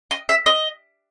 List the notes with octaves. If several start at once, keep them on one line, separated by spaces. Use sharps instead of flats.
D#5
E5
D#5